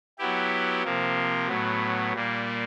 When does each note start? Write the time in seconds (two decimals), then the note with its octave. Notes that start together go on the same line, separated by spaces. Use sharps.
0.18 F#3 B3 E4 G4
0.84 C3 F3 A#3
1.48 A2 F#3 B3
2.12 A#2 G3 A#3